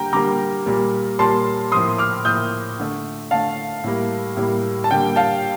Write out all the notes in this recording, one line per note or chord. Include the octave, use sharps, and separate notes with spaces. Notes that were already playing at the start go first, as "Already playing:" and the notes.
Already playing: D3 G3 A#3 G5 A#5
D3 G3 A#3 A#5 D6
A#2 G3 A#3
A#2 G3 A#3 A5 C6
A2 F3 A#3 C6 D#6
D6 F6
A2 F3 A#3 D#6 G6
D3 A3
D3 A3 F5 A5
A2 G3 A#3
A2 G3 A#3
A5
D3 G3 A#3 G5
F5 A5